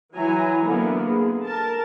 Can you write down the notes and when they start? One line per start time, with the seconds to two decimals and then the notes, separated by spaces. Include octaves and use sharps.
0.15 E3 F#3 E4 G#5 A#5
0.65 D3 A#3 B3 E4
1.08 G#4
1.44 A#4 A5